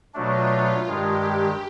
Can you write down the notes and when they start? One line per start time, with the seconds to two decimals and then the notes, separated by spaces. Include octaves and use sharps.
0.14 B2 F#3 A3 D4 F4
0.87 G2 D#3 G#3 G4
1.25 G4